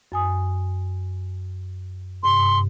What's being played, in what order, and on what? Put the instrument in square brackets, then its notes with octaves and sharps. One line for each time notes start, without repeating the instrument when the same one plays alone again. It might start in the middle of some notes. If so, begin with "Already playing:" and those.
[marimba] F#2 G#5 D#6
[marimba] G2 C3 [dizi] C6